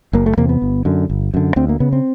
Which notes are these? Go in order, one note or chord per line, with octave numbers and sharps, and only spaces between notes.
F#1 A#3
A3
E2 C3 A#3
B3
G1
F#2 D3
G1
F#2 D3
D2 C4
A#3
C#3 B3
C4